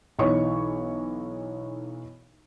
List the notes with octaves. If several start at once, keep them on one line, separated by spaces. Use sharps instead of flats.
B1 E3 D#4 C#5 C#6